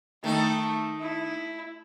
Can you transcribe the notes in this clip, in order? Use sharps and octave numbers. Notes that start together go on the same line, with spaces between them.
D#3 A3 D#4
E4